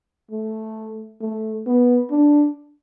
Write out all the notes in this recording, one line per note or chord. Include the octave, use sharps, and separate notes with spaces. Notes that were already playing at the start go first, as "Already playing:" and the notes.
A3
A3
B3
D4